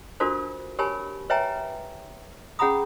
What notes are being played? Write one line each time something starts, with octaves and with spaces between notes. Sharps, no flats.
D4 F4 F#4 A4 A#4 C5
G4 A#4 C#5 G#5 A5 B5
B4 C#5 E5 G5 G#5 A#5
C#4 G#4 F#5 A#5 B5 D#6